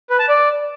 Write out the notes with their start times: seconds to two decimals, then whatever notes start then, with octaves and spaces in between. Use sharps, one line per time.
0.10 B4
0.19 A5
0.29 D5